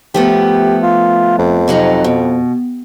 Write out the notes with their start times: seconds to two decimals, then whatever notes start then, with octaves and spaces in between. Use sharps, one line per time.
0.14 F3 A3 B3 G4
0.83 F4
1.39 F2
1.68 C3 F#3 D#4
2.04 B2